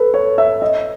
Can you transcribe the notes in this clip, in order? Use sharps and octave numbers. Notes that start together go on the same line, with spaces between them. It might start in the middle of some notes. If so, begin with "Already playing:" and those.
Already playing: A4 B4
C#5
E5
D#5